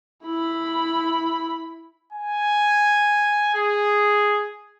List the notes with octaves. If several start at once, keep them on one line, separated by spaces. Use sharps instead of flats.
E4 B5
G#5
G#4